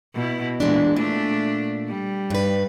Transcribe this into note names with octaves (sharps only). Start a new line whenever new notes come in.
B2 E4
E2 A#2 G#3 D4
A#2 A3 D4
G3
G2 B4